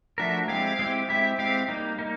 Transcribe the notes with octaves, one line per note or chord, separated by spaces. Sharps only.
F3 A3 D4 F#4 A#4 E5
G#3 C4 E4 G4 F5
G#3 C4 E4 G4
G#3 C4 E4 G4 E5
G#3 C4 E4 G4 F5
G3 A#3 D#4
A#3 D#4